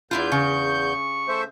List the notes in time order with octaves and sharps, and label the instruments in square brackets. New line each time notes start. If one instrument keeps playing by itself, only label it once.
[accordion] E2 G6 [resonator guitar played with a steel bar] D4 E4 F4
[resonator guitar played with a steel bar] C#3 [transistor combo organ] C#6
[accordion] A3 C5 E5